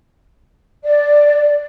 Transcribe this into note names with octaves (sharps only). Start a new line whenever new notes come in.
D5